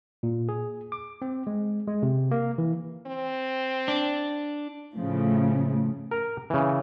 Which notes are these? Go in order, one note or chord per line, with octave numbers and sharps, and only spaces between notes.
A#2
G#4
D6
C4
G#3
G#3
C3
A#3
E3
C4
D4
A2 C#3 F3 A3
A#4 A#5
C#3 E3